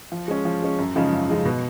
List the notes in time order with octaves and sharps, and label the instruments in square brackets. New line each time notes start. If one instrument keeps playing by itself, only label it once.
[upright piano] F3
G#3 C#4
F3
G#3 C#4
F#2
C#3 F3 G#3 D#4
F#2
C#3 F3 G#3 D#4
B2